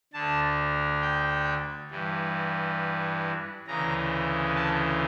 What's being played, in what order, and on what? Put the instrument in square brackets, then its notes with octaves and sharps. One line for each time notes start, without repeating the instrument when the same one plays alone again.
[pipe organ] D2 D3 A5
G5
G2 E3
D2 C#3 E3 A#5
A5